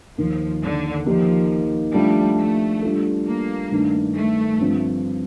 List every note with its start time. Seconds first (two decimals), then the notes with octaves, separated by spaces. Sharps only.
0.18 D#2 D#3 F3 A#3
0.63 D3
1.06 D#3 F3 A#3 D#4 G4
1.94 F3 G3 A3 D4 G4
2.38 A3
2.82 G3 D4 F4 A4
3.27 A#3
3.71 G2 D#3 A3 D4
4.16 A3
4.59 G2 D3 F3 C4